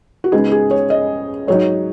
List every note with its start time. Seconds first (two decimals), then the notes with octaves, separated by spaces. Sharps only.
0.24 F#4
0.32 C#2 C#3 G#3 B3 D#4 G#4
0.52 G#4
0.71 C#5
0.90 D#5
1.47 G#2 F#3 D#4 C#5